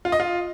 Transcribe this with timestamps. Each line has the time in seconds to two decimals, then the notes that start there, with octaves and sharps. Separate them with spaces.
0.05 F4
0.12 D#5
0.20 F4